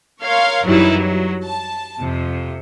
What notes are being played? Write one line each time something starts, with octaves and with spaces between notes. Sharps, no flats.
A#4 C#5 F5 C6
F#2 E3 F#3 G3 D#4 E4
F#3
A5
F2 C3